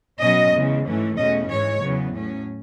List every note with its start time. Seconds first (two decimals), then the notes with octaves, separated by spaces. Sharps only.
0.21 B2 F#3 C#4 D#5
0.53 E2 C#3 G#3
0.85 G#2 E3 A3 C#4
1.17 E2 B2 A3 C#4 D#5
1.49 G#2 E3 G#3 C#5
1.81 E2 C#3 F#3 B3
2.13 A2 F#3 C#4